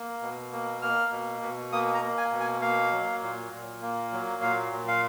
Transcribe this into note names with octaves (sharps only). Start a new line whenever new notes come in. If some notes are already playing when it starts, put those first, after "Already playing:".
Already playing: A#3
B2
A#3
A#3 F6
B2
B2
A#3 D#6
A#5
A#3
G#5
B2
G#5
A#3 F5
F#3
A#2
A#2
A#3
F#3
A#2 F5
A#2
F5